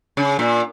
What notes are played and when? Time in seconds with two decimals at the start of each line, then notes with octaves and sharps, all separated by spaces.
0.17 C#3
0.39 A#2